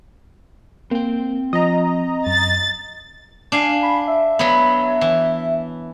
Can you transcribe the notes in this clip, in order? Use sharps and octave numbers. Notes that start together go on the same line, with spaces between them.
A#3 C4 G5
F3 D#5 A#5
F#2 A6
D4 F5 G#5
B5
E5
F#3 B3
E3